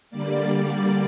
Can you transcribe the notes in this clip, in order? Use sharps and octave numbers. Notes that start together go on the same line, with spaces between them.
D3 G3 A#3 D5